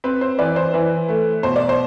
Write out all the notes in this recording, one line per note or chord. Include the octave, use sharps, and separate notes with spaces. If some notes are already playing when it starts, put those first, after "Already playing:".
C4 B4
C5
E3 B4 D5
C5
E3 B4
A3
B2 C5
D5
C5